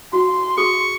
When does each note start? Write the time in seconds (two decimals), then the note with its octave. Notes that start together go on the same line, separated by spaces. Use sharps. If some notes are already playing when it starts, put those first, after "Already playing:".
0.13 F#4 C6
0.57 F#4 G#4 A4 C#6